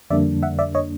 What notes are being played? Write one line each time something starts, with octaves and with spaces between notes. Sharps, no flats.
F2 D3 G3 A#3 D4 D5 E5
E5 F#5
D5 E5
C#5 D#5